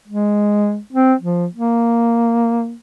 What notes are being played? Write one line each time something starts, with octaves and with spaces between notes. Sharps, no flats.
G#3
C4
F3
A#3